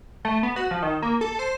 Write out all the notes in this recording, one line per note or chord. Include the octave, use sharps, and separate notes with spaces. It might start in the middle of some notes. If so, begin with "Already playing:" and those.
A3
B3
F#4
F3
D#3
A#3
A4
C5